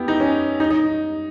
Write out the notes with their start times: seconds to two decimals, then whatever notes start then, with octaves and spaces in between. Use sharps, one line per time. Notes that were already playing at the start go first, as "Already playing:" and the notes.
Already playing: B3 E4 G4
0.08 D#4
0.20 C#4
0.60 D#4
0.71 D#4